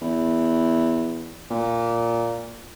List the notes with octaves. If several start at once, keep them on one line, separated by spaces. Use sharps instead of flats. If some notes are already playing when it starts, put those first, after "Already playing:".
E2
A#2